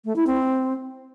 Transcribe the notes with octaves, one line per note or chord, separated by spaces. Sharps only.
A3
E4
C4